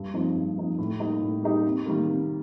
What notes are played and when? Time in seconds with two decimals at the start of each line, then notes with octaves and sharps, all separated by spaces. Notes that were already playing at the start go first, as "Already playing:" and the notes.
Already playing: G2
0.14 F3 C4 D#4
0.35 G2
0.58 F3 C4 D#4
0.79 A2
1.00 G3 A#3 D#4 G4
1.22 A2
1.43 G3 A#3 D#4 G4
1.65 C3
1.86 D#3 G3 A#3
2.08 C3